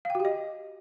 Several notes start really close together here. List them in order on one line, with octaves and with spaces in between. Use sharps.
F5 G5 F#4 G4 D#5